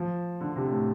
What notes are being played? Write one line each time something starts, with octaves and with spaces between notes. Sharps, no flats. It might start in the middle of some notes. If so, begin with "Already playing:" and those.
Already playing: F3
D3
C3
A2